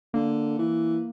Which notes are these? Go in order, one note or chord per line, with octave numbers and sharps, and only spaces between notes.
D3 A#3
E3